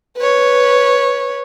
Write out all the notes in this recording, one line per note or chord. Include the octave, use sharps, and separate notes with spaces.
B4 C#5